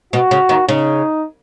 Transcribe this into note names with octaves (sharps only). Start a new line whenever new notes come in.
B2 F#4
C#3
D#2 D#3
C#3 D#4